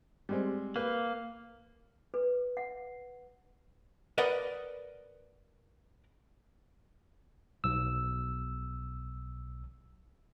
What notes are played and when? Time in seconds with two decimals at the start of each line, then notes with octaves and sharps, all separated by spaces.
0.29 G3 G#3 C4
0.76 A#3 B4
2.14 B4
2.57 F#5
4.18 A#4 B4 D5 D#5 F#5 B5
7.64 B1 E6